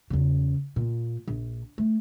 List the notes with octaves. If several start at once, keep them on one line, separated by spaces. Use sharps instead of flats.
E2 C#3
A#2
A#1
A3